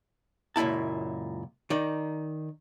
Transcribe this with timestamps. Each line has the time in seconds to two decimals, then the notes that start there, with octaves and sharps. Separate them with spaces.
0.56 C#2 F#2 A#2 E4 A5
1.70 D#3 D#4 D5